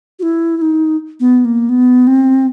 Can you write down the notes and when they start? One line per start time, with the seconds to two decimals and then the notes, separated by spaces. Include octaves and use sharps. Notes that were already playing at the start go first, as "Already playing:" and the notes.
0.19 F#4
0.23 E4
0.57 E4
0.62 D#4
1.20 B3
1.45 A#3
1.69 B3
2.07 C4